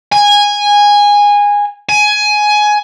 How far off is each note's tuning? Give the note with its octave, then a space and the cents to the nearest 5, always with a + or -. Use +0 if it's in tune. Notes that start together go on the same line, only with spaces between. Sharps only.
G#5 -15
G#5 +15